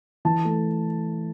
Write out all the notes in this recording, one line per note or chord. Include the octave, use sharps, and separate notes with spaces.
E3 A5
A3